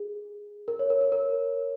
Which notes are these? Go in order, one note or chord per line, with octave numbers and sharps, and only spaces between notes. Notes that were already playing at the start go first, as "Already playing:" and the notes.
Already playing: G#4
A#4
C#5
A#4
A#4
A#4